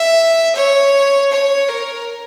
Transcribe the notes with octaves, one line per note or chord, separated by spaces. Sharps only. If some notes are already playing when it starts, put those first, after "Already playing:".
Already playing: E5
C#5
C#5
A#4